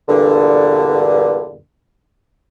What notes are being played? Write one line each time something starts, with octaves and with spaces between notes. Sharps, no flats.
E2 G2 A#2 D3